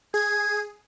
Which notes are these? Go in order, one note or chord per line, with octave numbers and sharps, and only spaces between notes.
G#4 G#6